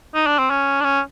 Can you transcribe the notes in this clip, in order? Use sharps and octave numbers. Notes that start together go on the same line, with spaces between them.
D#4
D4
C4
C#4
D4
C#4